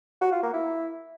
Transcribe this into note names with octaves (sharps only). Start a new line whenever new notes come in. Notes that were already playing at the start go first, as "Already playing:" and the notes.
F#4
F4
A#3
E4